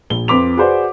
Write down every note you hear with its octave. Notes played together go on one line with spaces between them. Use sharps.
A#1 G7
F2 B4 C6 D6 B6 F7
F#4 G#4 B4 C5 D5 F#5